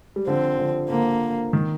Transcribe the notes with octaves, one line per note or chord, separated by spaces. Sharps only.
G3
D3 F3 C4
D3 F3
D3 A#3
D#3